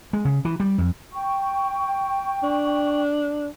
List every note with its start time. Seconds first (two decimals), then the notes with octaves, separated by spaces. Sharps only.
0.13 G#3
0.25 C#3
0.45 E3
0.60 G3
0.78 F2
1.13 G5 C#6
2.43 D4